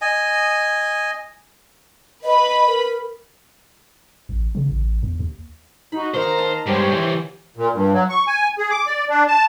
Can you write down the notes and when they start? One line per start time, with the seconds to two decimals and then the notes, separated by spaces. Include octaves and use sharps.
0.02 D#5 G#5
2.23 B4 D#5 B5
2.67 A#4
4.29 A1
4.55 C#3
4.69 A1
5.03 E2
5.19 D#2
5.92 D#4 F#4 B5
6.14 D#3 A#3 C5 A#5
6.38 F4 D#5 A5
6.66 G2 G#3 B3 G4 C5 C#5
6.92 E3 F3
7.57 A#2
7.74 G2
7.93 F#3
8.09 C#6
8.27 G#5
8.58 G#4
8.71 D6
8.87 D5
9.10 D4
9.28 A5